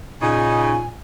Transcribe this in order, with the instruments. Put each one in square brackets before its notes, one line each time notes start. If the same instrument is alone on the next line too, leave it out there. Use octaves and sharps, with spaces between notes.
[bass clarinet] A#2 [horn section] C#3 D#4 [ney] G#5